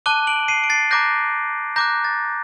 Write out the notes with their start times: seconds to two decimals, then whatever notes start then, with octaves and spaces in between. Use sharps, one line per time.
0.06 A5 D6 F#6 D#7 G7
0.27 D7 F#7
0.48 C7 D#7
0.64 D7
0.70 A6 C7
0.91 A#5 D6 F#6 G6 A#6
1.76 A#5 D6 F#6 G6 A#6
2.04 A6